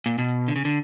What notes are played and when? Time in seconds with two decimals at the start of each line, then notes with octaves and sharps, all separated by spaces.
0.06 A#2
0.18 B2
0.48 D3
0.56 C#3
0.65 D3